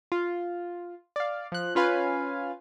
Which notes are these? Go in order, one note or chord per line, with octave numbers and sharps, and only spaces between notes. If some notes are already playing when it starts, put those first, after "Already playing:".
F4
D5 F5
F3 F#6
C#4 F4 B4 F5 G#5